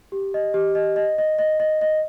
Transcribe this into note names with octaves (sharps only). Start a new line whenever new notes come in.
G4
D#5
G4
D#5
D#5
D#5
D#5
D#5
D#5